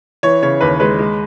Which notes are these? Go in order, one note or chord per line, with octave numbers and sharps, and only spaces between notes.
E3 C#5
C#3 C#5
D#2 B4
G#3 B4
G#3